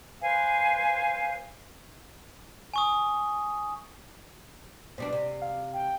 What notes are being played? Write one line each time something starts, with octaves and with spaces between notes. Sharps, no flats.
B4 C5 F5 G#5
G#5 C#6 D#6
B2 G3 D4 C5 D5
C3
F5
G5